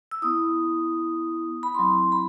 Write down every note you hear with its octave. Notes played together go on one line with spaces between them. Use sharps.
E6
B3 E4 D#6
B5
F#3 C4 E4 C6
B5